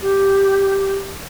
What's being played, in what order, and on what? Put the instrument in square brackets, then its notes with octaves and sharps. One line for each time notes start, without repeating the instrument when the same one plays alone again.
[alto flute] G4